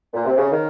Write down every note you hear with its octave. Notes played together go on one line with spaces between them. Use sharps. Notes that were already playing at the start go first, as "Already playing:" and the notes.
A#2
C3
C#3
D#3